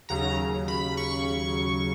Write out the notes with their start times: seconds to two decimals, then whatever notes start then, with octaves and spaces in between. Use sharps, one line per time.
0.09 D#2 C#3 F#3 A#5
0.68 B5
0.97 C#6